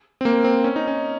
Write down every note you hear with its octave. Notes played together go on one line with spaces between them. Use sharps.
C4
A#3
C4
C#4
D#4
C#4